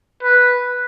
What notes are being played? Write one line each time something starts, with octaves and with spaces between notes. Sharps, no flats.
B4